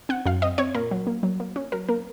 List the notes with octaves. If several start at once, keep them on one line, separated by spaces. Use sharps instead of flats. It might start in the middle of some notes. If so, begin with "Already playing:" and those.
C4 F#5
F#2 F5
C4 D#5
C4 C#5
A#2 A#4
F#3
A#3
F#3
A#3
C#4
F#3 A#4
A#3 A#4